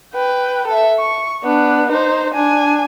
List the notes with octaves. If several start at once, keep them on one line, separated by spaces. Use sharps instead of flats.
B4 G5
A4 E5
C#6
B3 D4
D#4 C5
D4 G#5